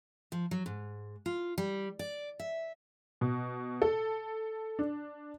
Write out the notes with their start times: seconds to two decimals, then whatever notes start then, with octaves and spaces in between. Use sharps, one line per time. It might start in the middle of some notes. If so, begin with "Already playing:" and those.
0.32 F3
0.51 F#3
0.66 G#2
1.26 F4
1.58 G3
1.99 D5
2.40 E5
3.21 B2
3.82 A4
4.79 D4